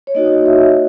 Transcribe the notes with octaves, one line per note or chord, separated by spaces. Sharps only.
C#5
A#3 D#4 F#4 D#5
E5